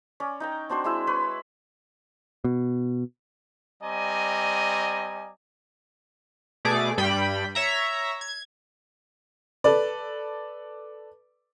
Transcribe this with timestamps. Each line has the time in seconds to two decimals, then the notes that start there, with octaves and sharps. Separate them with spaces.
0.20 C#4 D5
0.40 D#4 G5 A#5
0.69 C4 D4 F#4 C5
0.84 G#3 E4 E6
1.07 B4 C#5 B5 C6
2.44 B2
3.82 G3 C4 D5 D#5 G#5 A#5
6.65 B2 A3 G#4 D5 D6
6.98 G2 G3 G5 B5
7.55 C#5 E5 A#5
8.21 G#6
9.64 A4 B4 D5